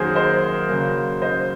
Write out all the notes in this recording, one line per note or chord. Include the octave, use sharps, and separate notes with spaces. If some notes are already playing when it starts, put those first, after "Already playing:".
Already playing: F#2 D#3 F#3 A#3 G#4 A#4 C5
C5 D#5
C#3 F#3 A#3
C5 D#5